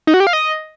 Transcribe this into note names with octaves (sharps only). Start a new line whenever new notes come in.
D#4
F#4
G4
F5
D#5